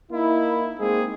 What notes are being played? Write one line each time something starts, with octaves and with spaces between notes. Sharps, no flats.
A#3 D#4 E4
G#3 A#3 C4 D#4 G#4